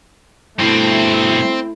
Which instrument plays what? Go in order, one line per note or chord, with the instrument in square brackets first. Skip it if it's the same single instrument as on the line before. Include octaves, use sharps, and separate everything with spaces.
[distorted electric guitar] G2 B2 [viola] A3 [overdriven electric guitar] C4 [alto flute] E4